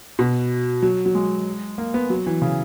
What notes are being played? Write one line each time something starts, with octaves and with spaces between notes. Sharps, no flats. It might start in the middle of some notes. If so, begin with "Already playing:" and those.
B2
F#3
F#3
G#3
A#3
B3
F#3
E3
C#3